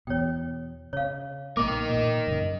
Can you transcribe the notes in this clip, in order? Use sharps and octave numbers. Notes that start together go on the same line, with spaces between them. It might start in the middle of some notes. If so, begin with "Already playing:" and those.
E2 B2 C#5 G5
C#3 C#5 F5
A#1 B2 A#3 A#4 D#5 D6
A#2 A#3
F#2 C#3